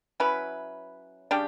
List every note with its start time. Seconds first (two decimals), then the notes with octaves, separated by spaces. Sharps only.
0.20 F#3 C#4 E4 B4
1.31 C#3 G3 D4 G4